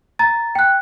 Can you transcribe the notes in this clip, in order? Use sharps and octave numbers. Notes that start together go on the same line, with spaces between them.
A#5 A6
G5 F#6